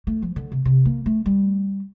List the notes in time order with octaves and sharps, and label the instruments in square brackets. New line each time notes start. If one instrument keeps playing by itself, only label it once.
[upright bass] A3
F3
D3
C3
C3
A#3
A3
G3